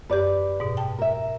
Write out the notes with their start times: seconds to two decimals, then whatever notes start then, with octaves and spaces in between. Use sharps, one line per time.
0.10 F#2 G4 B4 D5
0.60 G#2 B2
0.77 G5 A5
0.98 A#4 E5